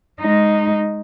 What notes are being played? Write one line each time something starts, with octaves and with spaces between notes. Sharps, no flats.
G#3 D#4